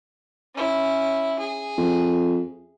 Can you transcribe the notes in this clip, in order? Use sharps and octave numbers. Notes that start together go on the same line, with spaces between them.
C#4 E4
G#4
F2